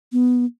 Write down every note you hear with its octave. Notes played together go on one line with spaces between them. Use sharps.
B3